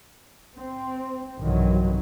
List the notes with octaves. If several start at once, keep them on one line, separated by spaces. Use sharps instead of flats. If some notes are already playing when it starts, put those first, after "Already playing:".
C4
B1 G2 C3 D#3 E3 F#3